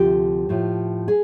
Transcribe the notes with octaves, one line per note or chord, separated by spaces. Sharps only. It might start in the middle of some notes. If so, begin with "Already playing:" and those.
Already playing: D2 C3 F3 G4
A2 F3
G#4